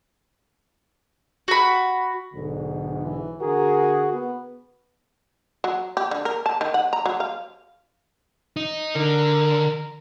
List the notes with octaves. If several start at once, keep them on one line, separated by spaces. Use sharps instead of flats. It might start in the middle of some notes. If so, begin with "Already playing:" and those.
F#4 B5
B1 G#2 D3
E3
D3 F#4 G#4 A#4
B3
F#3
G4
D3
A#4
A5
D#3
F#5
A#5
F#3
F5
D#4
D3 A#4